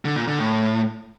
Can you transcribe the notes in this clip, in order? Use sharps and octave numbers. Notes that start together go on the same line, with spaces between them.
D3
A#2
D3
A2